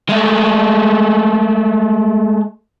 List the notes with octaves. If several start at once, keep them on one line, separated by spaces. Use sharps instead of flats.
G#3 A3